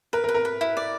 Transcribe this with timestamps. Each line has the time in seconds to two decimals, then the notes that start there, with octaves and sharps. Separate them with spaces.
0.13 A#4 B4
0.24 A#4
0.28 B4
0.35 A#4
0.45 B4
0.61 E4
0.77 D5